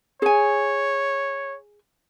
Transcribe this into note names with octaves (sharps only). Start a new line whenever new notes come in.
G#4 C#5 G#5